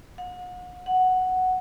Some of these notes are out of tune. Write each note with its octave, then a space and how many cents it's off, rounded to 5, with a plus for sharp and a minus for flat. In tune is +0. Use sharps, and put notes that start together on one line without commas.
F#5 -45
F#5 +0